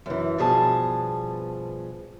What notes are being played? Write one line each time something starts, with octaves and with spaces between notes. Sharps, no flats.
F#2 E3
G2 B2 F3 G#4 A5